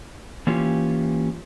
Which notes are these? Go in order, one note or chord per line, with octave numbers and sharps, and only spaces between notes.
E3 A#3 C#4 F4 G4